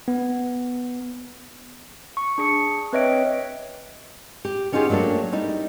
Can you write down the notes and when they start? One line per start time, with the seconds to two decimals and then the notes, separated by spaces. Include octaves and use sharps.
0.08 B3
2.17 C#6
2.38 D4 G#4 C#7
2.93 C4 B4 C#5 D#5 E5 D7
4.45 G4
4.72 B3 C#4 D#4 F4 G4 G#4
4.90 F#3 A3 A#3 D4 G4
5.32 G3 D#4 E4